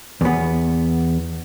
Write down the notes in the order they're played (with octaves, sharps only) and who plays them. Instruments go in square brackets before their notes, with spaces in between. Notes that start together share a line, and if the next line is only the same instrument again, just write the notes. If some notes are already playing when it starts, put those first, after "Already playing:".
[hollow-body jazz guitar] E2 B3